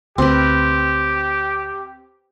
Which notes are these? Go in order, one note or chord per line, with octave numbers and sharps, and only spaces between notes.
D2 C4 G4 B4